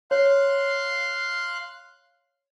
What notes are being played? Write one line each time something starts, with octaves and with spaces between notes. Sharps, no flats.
C#5 F5 C6 F#6